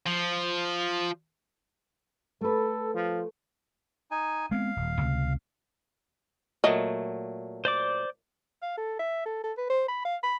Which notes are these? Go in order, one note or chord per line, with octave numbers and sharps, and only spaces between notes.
F3
A3 A4 B4
F3
D#4 G#5
G#3 B3 C4 F5
D#1
C#2 C3
A#2 F#3 A3 D#5
C5 D5 D6
F5
A4
E5
A4
A4
B4
C5
B5
F5
B5